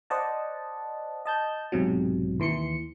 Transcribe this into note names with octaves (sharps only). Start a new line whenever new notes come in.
C5 D5 D#5 F#5 A5
D#5 A5 G6
B1 G#2 C3 F#3
D#2 E3 C6 C#7